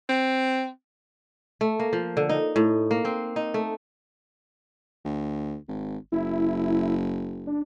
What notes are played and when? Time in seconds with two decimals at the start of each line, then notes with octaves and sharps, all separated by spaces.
0.09 C4
1.61 A3
1.80 A#3
1.93 F3
2.17 D3
2.29 D#4
2.56 A2
2.91 A#3
3.05 C4
3.36 D#4
3.54 A3
5.05 D2
5.68 G#1
6.12 F#1 E4
7.47 D4